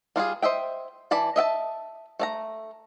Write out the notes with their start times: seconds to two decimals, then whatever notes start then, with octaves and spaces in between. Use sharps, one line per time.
0.16 G3 F4 F#4 G#4
0.42 C5 D#5 E5 G5
1.11 E3 D5 A5 B5
1.36 D#5 E5 G5 A5
2.19 A3 D5 A#5